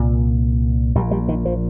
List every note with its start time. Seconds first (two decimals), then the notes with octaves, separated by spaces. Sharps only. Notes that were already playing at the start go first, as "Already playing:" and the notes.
Already playing: C2 A#2
0.95 A#1 A#2 G3
1.11 G3
1.28 D#3
1.45 F3